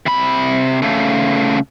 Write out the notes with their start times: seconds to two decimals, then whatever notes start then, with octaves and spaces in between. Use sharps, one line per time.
0.06 C3 B5
0.82 C#3 A3